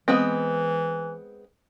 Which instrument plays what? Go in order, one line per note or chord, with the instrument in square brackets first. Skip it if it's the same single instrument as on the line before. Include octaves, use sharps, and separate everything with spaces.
[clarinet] E3 [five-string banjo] G#3 B3 C4